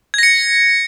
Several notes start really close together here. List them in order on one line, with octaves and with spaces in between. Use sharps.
G#6 A#6 C#7